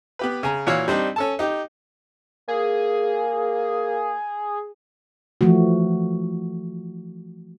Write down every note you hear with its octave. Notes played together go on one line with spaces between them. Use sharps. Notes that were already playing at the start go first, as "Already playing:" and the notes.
B3 G4 B4
C#3 G#5 A#5
A#2 E3 F#4 C#5 F5 E6
G3 C4 D4 D#4
C#4 A4 A5
D#4 G4
A#3 G#4
E3 F3 A3 F#4